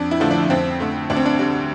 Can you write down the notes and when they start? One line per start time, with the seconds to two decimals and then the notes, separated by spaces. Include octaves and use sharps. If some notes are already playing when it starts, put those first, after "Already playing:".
Already playing: F2 D4
0.11 E4
0.20 D3 F3 A3
0.31 D4
0.50 F2 C4
0.80 D3 A3
1.10 D2 D4
1.17 C4
1.25 D4
1.39 D3 G3 D4